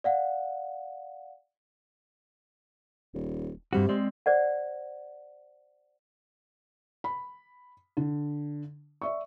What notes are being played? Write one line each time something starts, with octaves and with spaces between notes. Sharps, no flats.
D5 F5 F#5
D#1
G2 C3 G3 F#4
G#3 C4 D5
C5 D5 F#5
B5
D3
D5 E5 C#6